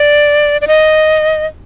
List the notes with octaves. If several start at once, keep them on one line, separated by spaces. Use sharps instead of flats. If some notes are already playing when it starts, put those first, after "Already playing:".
Already playing: D5
D5
D#5